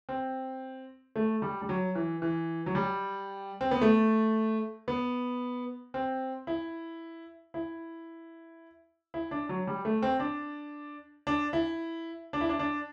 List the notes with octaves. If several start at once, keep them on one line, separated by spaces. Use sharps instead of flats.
C4
A3
G3
G3
F#3
E3
E3
F#3
G3
C4
B3
A3
B3
C4
E4
E4
E4
D4
F#3
G3
A3
C4
D4
D4
E4
D4
E4
D4
D4